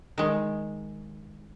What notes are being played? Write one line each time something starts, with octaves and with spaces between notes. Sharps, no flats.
D#3 G#3